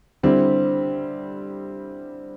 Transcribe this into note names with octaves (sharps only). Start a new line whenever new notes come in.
D3 G3 C4 E4